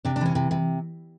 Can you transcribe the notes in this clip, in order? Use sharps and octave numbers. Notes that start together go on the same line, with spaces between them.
C3 D4
D4
E3 C#4
C3
C3